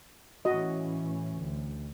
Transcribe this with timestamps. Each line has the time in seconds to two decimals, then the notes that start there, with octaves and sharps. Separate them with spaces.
0.45 A2 E3 C#4 F#4 D#5
1.36 D2